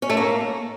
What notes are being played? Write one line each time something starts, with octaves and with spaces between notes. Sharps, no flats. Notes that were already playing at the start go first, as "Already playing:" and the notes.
C#4
A3
A#3